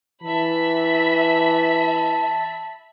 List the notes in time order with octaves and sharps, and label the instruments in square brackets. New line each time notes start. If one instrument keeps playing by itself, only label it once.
[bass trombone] E3 [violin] E5 B5 [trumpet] A5